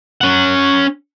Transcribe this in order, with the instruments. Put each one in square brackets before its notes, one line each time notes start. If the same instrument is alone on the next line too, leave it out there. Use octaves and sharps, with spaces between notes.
[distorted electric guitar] C#4 F#5